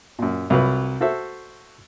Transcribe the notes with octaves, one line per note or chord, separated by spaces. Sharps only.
F#2 A#2
C2 F#3 F4 B4
F#4 A4 C5 E5